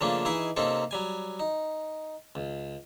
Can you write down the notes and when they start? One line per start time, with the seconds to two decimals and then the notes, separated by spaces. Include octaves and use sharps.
0.01 C#3 F3 A3 A#3 C#4 D4
0.25 E3 D#4 E4 G#4 D#5 G#5
0.56 C3 A#3 C4 C#4 D#4 A4
0.91 F#3 G3 G#5
1.40 D#4
2.35 C#2